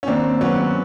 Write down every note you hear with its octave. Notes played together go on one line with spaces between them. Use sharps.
C#4
D#2 C4 D4
F#3 B3 C#4